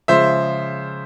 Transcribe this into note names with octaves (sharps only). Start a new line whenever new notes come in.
C#3 F3 G#3 C5 E5